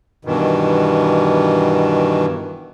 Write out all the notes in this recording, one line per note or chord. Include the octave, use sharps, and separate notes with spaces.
G2 B2 D#3 E3